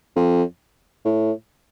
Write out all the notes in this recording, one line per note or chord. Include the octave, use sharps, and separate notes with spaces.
F2
A2